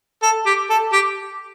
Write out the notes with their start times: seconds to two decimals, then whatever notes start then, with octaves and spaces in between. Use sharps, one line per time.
0.23 A4
0.46 G4
0.70 A4
0.92 G4